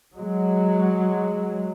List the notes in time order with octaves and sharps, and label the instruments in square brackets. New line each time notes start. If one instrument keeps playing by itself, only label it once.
[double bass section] F#3 G#3